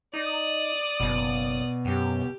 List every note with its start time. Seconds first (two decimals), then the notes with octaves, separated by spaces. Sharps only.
0.14 D#4 D5 D#6
1.00 F#1 B2
1.85 F#2 G4